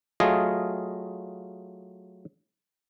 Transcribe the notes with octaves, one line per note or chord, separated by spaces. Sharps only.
F#3 A3 F4 G#4 D#5 F5